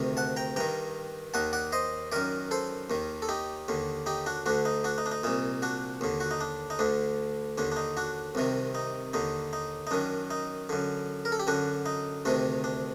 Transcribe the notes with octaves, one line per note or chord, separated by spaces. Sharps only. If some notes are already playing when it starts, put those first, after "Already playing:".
Already playing: D2 C3 D#3
F#5 A5
G5 A#5
G2 D#3 G5 A#5
D#2 D#3 F#5 A5
D5 F#5
C5 D#5
F#2 D#3 A#4 D5
A4 C5
D#2 D#3
A4
D#4 G4
D#2 D3
D#4 G4
D4 F#4
D2 D3 D4 F#4
D#4
D4 F#4
D#4
D4
D#4
C2 A#2 D#4
D4 F#4
D#2 D3
F#4
D#4
D4
D#4
D2 D3 D4
D#2 D3 D4
D4
D#4
D4 F#4
C2 C3 D#3
D#4
D#2 D3 D#4
D#4
D#4
F#2 D#3 D4
D#4
F#2 D3
A#4
A4
G4
F#2 D3 D4 F#4
D#4
D2 C3 D#3 D4
D4